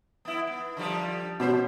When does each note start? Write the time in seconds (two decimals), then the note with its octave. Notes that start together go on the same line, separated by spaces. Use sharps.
0.25 B3 E4
0.47 B3
0.77 D3 F3 G3
1.40 B2 C#4 C5